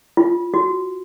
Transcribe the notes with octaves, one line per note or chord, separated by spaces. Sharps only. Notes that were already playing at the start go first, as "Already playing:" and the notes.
F4
F#4